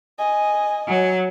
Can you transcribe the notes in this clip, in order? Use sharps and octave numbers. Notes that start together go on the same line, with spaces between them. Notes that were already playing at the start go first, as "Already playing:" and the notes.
D#5 G#5
F#3